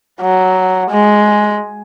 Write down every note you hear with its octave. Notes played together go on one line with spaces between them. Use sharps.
F#3
G#3